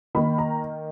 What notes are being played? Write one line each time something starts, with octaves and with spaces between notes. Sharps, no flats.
D#3 A#3 B5
A#5